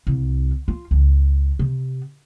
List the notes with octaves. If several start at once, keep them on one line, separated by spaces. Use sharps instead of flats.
C2
F4
C#2
C3